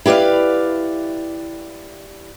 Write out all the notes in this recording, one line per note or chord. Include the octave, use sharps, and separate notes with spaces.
E4 G4 B4 D5 F5